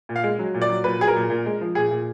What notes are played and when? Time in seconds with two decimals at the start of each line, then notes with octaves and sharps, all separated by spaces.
0.09 A#2
0.16 F5
0.24 G#3
0.39 F#3
0.54 A#2
0.62 D5
0.69 F#3
0.84 A#2 B4
0.99 F#3 G#4
1.08 A#4
1.16 A#2
1.30 A#2
1.46 G#3
1.61 F3
1.75 A#2 G#4
1.91 A#2